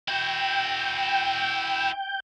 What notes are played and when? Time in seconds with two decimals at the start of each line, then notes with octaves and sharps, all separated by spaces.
0.08 E4 F#4 G5